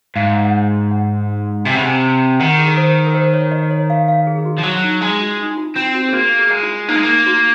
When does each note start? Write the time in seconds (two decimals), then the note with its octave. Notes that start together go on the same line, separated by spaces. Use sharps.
0.16 G#2 F5
0.41 F#5
0.91 F#5
1.65 C3 G#5
1.75 C#3 F#5
1.84 C3 G#5
2.40 D#3 F#5
2.58 G#4
2.68 A#4
2.77 C5
3.07 A#4
3.14 C5
3.34 C#5
3.52 D#5
3.71 C#5
3.90 F5
4.08 F5
4.27 G#4
4.38 G#4
4.45 F#4
4.59 F3
4.64 F#3 F#4
4.84 D#4
5.01 G#3 F4
5.20 F#4
5.39 D#4
5.50 D#4
5.58 F4
5.76 C4 F4
5.95 F#4
6.09 G#4
6.13 A#3 F#4
6.39 G#4
6.51 G#3
6.63 F4
6.88 A#3 D#4
6.96 G#3
7.03 A#3
7.27 F#4